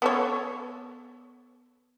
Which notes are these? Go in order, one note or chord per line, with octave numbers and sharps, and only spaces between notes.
B3 A4 C#5